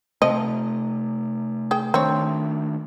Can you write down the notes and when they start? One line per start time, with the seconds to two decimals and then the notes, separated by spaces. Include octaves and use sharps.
0.22 C3 F3 A3 C4 D#5
1.71 G#4 G5
1.94 D#3 A3 C4 D4 C#5